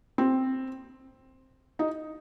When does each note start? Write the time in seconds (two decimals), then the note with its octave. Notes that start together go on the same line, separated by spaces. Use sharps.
0.18 C4
1.79 D#4